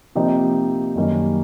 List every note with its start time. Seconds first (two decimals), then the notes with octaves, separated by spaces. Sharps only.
0.15 C3 F3 A#3 D#4 G4
0.95 F#2 D#3 G3 A#3 C#4